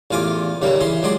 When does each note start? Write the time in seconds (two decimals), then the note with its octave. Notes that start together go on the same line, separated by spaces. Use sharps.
0.11 A1 E2 F4 G#5 D6
0.62 D#2 C#3 G3 A#3
0.81 E3 G#4 C6
1.03 C#2 F#3 G#4 D5 C6